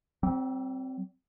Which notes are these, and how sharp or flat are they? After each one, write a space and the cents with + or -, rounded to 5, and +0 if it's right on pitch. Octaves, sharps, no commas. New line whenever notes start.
G3 -45 C4 +0